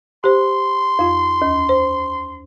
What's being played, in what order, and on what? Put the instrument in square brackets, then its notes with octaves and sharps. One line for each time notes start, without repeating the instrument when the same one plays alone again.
[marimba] G4 C5 [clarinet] C6
[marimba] F2 F4
D#2
C5